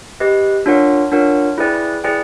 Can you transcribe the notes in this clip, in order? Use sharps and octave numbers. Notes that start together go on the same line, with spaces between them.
G4 B4 D#5
D4 F4 A#4 C#5 F#5
D4 F4 A#4 C#5 F#5
E4 G#4 B4 D5 G5
E4 G#4 B4 D5 G5